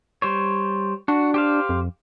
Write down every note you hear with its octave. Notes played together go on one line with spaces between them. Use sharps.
G3 C5 C#5
D4 F#4
G4 C5 F5
F2